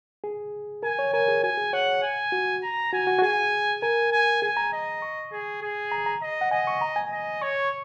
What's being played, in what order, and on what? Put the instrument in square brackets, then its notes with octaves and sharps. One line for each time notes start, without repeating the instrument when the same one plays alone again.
[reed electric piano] G#4
[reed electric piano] A#4 [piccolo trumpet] G#5
[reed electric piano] C#5
[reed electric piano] A#4 [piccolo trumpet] G#5
[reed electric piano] G#4
[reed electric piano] F#4 [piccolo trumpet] G#5
[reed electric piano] G#4
[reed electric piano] C#5 [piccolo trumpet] F#5
[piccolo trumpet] G#5
[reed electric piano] F#4
[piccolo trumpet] A#5
[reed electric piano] F#4 [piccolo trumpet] G#5
[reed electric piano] F#4
F#4
[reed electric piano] G#4 [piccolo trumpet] G#5
[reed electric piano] A#4 [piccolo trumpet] G#5
[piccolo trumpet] G#5
[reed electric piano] G#4 [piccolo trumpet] G#5
[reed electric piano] A#5
[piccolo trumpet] D#5
[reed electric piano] C#6
[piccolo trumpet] G#4
G#4
[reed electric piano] A#5
A#5
[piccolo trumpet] D#5
[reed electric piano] F#5
[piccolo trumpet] D#5 [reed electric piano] G#5
[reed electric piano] C#6
A#5
G#5
[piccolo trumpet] D#5
[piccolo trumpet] C#5 [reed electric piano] C#6